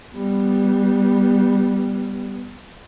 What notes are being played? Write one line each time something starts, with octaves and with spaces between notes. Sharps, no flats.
G3 B3